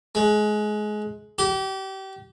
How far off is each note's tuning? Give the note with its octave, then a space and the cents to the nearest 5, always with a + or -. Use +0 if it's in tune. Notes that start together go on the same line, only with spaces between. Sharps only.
G#3 +25
G4 -30